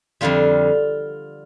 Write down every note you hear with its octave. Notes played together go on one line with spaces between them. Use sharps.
F2 D3 G3 F4